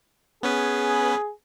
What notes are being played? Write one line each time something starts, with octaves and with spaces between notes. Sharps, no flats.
B3 C#4 G#4 B4